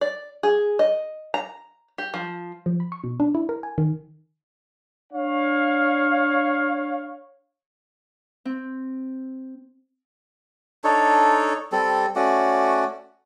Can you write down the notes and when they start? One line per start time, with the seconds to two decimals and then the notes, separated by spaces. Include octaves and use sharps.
0.01 D5
0.43 G#4
0.79 D#5
1.34 A#5
1.98 G4
2.14 F3
2.66 F3
2.80 B5
2.92 C#6
3.04 B2
3.20 D4
3.35 E4
3.49 A#4
3.63 G#5
3.78 D#3
5.13 D4 C#5 F5
8.45 C4
10.84 D4 D#4 A4 C#5
11.72 G3 C4 A4
12.16 A3 C#4 F#4 D5